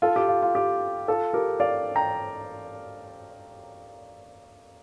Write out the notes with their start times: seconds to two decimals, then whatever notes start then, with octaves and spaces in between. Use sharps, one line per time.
0.02 F4 A4
0.16 G4
0.29 F4
0.42 F4
0.55 G4
1.08 F4 A4
1.33 G4 A#4
1.60 D5 F5
1.96 G5 A#5